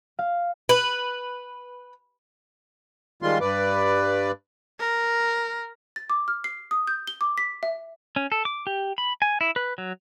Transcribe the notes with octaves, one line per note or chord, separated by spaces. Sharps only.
F5
B4
D#3 G3 G#3 F4 C6
G2 B4 D5
A#4
A6
D6
F6
C7
D#6
G6
G7
D6
B6
E5
C#4
A4
D6
G4
B5
G#5
E4
B4
F#3